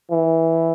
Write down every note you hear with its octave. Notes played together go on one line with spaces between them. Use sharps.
E3